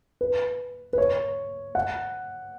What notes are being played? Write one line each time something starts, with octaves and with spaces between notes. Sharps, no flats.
B4
B4
C#5
F#5